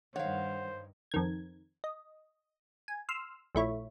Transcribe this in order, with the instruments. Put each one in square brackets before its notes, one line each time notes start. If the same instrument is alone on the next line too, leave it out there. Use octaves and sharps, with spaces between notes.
[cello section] G2 D#3 [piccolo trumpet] C5 [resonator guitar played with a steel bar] C#5 F5 [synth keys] F#5
[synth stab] F2 D#3 G#6
D#5
G#5
C6 E6 F6
A#1 A3 E4 C#5